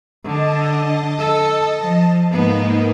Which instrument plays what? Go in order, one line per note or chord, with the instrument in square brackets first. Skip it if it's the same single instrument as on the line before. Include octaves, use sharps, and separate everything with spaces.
[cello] D3 [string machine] D#5 A5
[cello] A4
F3
[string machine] G#2 A#3 D#4 [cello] B3